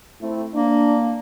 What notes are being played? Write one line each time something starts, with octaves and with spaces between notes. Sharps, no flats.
A3 C4 E4
A#3 D4